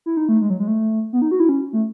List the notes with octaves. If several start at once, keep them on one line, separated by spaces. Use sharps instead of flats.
E4
D#4
A3
G#3
F#3
G#3
A3
B3
D#4
F#4
E4
C#4
A3